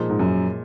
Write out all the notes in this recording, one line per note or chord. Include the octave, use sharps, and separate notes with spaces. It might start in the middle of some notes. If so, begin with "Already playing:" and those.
Already playing: A#2 F3 G#3 D#4
G#2
F#2